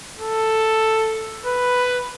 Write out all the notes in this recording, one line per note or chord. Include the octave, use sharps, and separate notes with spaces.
A4
B4